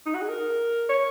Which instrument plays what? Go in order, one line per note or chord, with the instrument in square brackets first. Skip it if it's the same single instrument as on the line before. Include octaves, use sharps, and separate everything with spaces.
[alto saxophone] D#4
F#4
G#4
A#4
C#5